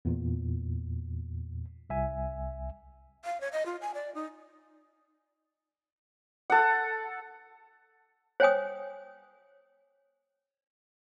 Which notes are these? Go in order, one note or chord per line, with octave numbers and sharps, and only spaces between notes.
E2 A#2
C2 E5 G#5
F5
C#5
D#5
F4
G#5
D5
D#4
A4 F#5
C5 C#5 G5 G#5 D#6